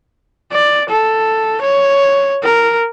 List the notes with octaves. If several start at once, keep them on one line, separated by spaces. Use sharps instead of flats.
D5
A4
C#5
A#4